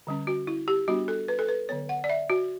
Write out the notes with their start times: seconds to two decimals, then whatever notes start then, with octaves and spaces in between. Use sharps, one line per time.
0.07 D3 G3 C#4
0.27 F#4
0.47 E4
0.68 G4
0.88 G3 B3 D4 F#4
1.08 A4
1.28 B4
1.39 A4
1.49 B4
1.69 D3 F#3 B3 C#5
1.89 F#5
2.04 D5
2.10 E5
2.30 F#4